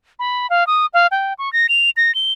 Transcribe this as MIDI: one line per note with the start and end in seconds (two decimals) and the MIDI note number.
0.19 0.49 83
0.50 0.66 77
0.67 0.86 87
0.94 1.07 77
1.11 1.33 79
1.39 1.52 85
1.53 1.67 94
1.69 1.90 101
1.97 2.14 94
2.15 2.33 103